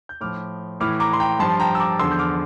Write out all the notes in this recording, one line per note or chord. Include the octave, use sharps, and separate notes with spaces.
G6
A2 F3 D6 F6
A2 E3 D6 F6
A#5 D6
C6
G5 A#5
G2 F3 A5 C6
G5 A#5
E6
A#5 D6
E2 D3 F3 C6 E6
G6
D6 F6